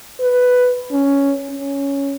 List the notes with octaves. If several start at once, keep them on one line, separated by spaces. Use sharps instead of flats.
B4
C#4
C#4